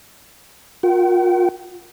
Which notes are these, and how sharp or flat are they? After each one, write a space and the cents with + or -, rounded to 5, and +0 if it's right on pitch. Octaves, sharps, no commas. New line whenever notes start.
F4 +30 A#4 +20 G5 -45